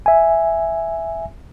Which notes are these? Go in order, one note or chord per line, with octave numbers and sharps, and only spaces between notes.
E5 G#5